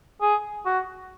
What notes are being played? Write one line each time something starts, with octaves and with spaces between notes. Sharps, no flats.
G#4
F#4